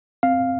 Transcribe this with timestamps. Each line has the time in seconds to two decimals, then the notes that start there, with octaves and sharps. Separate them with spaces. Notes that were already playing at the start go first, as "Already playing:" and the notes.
0.23 C4 F5